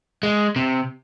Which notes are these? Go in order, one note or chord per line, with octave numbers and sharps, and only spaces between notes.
G#3
C3